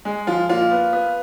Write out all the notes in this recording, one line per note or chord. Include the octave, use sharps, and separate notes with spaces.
G#3
F3 F4
A#2 F4
B3
B3